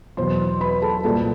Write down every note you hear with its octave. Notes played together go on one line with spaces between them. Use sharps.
E2 B2 F#3 C5 C6
B4 B5
A4 A5
C2 A#2 G3 A4 A5